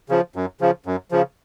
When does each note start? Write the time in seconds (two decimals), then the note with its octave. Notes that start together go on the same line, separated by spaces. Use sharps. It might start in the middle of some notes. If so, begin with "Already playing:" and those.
0.09 C#3 F3
0.36 F#2
0.61 C#3 F3
0.86 F#2
1.11 C#3 F3